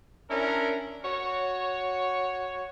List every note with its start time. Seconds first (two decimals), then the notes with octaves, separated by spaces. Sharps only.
0.30 C#4 D4 E4 A#4
1.04 F#4 C#5